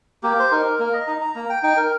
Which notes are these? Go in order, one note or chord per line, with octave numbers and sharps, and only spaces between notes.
A#3 G4
C5
D#4 A#4
A#3 A#4
D#5
D#4 A#5
A#5
A#3 A#5
G5
D#4 G5
A#4